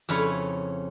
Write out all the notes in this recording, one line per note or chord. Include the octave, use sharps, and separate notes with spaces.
F2 C#3 C#4 E4 B4 C#5